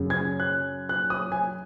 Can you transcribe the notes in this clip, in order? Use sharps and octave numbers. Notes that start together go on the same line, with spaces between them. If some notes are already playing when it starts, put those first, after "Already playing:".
Already playing: F#2 C#3
G#6
F#6
F#6
D#6
G#5